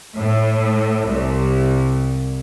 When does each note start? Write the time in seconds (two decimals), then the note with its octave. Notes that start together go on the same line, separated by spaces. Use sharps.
0.18 A2
1.07 C2